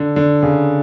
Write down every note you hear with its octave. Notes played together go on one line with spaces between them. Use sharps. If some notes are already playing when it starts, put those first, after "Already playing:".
Already playing: D3
D3
C#3